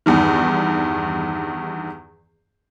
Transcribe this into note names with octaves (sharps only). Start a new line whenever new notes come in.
E2 G2 D#3